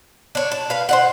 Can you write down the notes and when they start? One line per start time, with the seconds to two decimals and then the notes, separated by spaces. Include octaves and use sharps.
0.35 D4 C#5
0.52 A5
0.70 B4 F5
0.89 C5 D#5 F#5